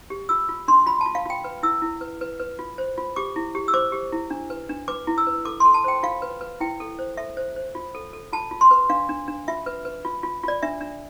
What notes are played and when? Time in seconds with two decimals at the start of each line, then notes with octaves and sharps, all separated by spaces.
0.10 G4
0.29 F4 E6
0.49 F4
0.68 D4 C6
0.86 F4 B5
1.01 A5
1.06 F4
1.15 F5
1.26 F4 G5
1.44 B4
1.63 E4 E6
1.82 E4
2.01 B4
2.21 B4
2.40 B4
2.59 F4
2.78 C5
2.98 F4
3.16 G4 D6
3.36 E4
3.55 G4
3.68 E6
3.74 C5 D6
3.92 G4
4.12 E4
4.30 D4
4.50 B4
4.69 D4
4.88 B4 D6
5.07 E4
5.18 E6
5.27 B4
5.45 A4 D6
5.60 A4 C6
5.74 A5
5.84 C5 G5
6.03 F4 F5
6.22 B4
6.41 B4
6.60 E4 G5
6.80 A4
6.99 C5
7.17 A4 E5
7.37 C5
7.56 C5
7.75 F4
7.95 A4
8.13 A4
8.33 F4 A5
8.51 F4
8.61 C6
8.71 B4
8.90 D4 F5
9.09 D4
9.28 D4
9.48 F4 E5
9.66 B4
9.85 B4
10.05 F4
10.23 F4
10.43 F4 D5
10.63 D4 E5
10.81 D4